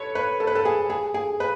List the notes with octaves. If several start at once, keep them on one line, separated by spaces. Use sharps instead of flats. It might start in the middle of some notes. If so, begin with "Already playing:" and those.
Already playing: A4 B4 C#5
B4
A4
B4
A4
G#4
G#4
G#4
B4